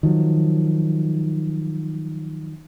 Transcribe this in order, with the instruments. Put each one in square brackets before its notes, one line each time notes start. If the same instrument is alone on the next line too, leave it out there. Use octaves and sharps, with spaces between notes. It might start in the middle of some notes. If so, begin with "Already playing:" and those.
[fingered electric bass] D#3 F3 F#3